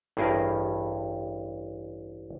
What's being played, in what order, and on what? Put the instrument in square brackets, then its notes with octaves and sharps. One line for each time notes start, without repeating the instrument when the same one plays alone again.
[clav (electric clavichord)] A1 G2 G4 G#4 A#4